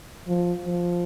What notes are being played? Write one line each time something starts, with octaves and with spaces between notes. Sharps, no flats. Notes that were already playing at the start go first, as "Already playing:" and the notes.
F3
F3